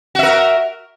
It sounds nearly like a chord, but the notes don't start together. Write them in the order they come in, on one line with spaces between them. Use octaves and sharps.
F#4 E5 A#4